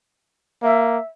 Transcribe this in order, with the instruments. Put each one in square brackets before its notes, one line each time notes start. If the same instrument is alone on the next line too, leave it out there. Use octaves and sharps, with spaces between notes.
[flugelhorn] A#3 [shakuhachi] E5